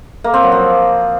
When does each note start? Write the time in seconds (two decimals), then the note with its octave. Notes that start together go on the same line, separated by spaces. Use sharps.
0.24 A#3
0.34 C4
0.43 F#3
0.52 F3